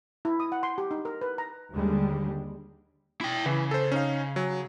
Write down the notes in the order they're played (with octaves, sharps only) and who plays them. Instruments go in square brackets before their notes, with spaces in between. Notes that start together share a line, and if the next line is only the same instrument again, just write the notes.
[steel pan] E4
D#6
F#5
C6
G4
D#4
A#4
B4
A#5
[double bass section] D#2 D3 G3 G#3
[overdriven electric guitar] E4 G5
[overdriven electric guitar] C#3 [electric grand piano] E3
[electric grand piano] A4 C5
C#4 D#4 F5
F#3